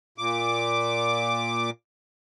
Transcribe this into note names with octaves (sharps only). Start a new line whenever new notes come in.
A#2 D6